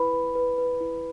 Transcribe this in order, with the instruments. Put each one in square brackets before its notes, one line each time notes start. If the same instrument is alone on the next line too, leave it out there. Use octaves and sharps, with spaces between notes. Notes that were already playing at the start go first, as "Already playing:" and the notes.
Already playing: [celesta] E4 B4 B5
B4
B4
B4
E4